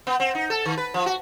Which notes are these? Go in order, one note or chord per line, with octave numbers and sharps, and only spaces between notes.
B3
C4
D#4
A4
D#3
B4
F3
F#4